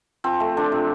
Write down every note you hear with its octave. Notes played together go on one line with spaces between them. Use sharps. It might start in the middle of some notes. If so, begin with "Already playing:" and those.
F3 C4
A3
F3 D4
C3